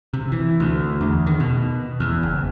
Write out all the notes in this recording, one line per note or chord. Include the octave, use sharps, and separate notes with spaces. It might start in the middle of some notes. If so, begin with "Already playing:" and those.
C3
E3
D2
E2
D#3
B2
E2
F#1